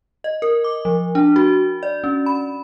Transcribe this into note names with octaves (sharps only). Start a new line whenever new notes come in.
D#5
A#4
D6
F3
D4
F#4
D5
C#4
B5